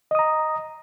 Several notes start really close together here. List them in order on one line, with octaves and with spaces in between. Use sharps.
D#5 D#6 A#5